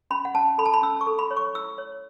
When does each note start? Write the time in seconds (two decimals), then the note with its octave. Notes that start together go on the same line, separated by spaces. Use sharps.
0.11 C#4 B5
0.25 F#5
0.34 C#4 A5
0.58 A4 B5
0.66 A5
0.73 B5
0.82 C#4 E6
1.01 C#6
1.07 A4
1.19 B5
1.31 C#5
1.37 C#6
1.55 E4 E6
1.78 C#5